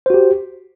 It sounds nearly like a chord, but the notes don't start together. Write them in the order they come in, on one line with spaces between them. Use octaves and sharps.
C5 F#4 G4